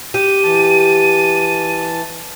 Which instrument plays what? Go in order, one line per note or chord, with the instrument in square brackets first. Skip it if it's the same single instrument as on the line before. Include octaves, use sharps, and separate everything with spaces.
[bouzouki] G4 [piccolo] D#7
[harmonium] E3 A5